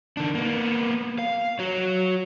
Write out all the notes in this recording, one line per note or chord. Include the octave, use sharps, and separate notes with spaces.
D#3 D4
A#3 B3
F5
F#4 C#5